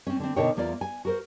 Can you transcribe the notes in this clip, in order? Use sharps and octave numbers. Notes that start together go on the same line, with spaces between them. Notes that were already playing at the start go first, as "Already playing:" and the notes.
C4 C#4
D3 C4
B2 D3 D#4 A#4 C#5 G5
E2 A#3 F4 D5
G#5
F#4 A#4 C5